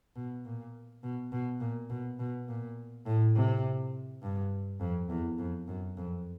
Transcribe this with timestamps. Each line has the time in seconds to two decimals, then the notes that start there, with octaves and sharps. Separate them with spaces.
0.16 B2
0.45 A#2
1.03 B2
1.32 B2
1.60 A#2
1.90 B2
2.19 B2
2.48 A#2
3.06 A2
3.35 C3
4.22 G2
4.80 F2
5.09 E2
5.38 F2
5.68 F#2
5.97 F2